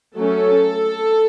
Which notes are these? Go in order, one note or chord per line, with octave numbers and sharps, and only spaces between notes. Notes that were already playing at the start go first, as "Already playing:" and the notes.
F#3 A3 C#4 A4